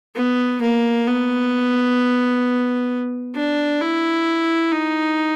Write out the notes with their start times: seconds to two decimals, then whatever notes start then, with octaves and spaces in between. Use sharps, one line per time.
0.15 B3
0.62 A#3
1.07 B3
3.36 D4
3.81 E4
4.72 D#4